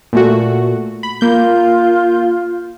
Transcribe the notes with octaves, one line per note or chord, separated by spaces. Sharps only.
A#2 A3 F#4
B5
A#3 F4 G6